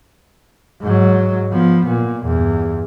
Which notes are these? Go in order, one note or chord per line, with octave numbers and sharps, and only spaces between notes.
G#2 F#3
F3 B3
A#2
E2 G2